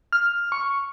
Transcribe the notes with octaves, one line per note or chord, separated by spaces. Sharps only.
F6
C#6